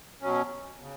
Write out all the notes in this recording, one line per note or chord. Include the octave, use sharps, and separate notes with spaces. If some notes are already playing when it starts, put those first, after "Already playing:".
B2 F#3 C#4
C#3